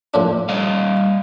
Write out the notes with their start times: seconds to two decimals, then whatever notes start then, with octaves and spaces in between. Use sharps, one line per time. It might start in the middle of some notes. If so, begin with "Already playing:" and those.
0.14 A2 F3 D4
0.49 G3 D#5 F5